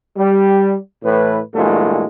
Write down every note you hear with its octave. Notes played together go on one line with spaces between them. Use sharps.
G3
A2 E3 B4
G2 A#2 E3 F#3 G#3 A3